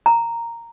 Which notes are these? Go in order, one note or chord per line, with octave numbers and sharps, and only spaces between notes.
A#5